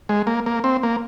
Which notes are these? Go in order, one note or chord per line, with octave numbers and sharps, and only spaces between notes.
G#3
A#3
A#3
C4
A#3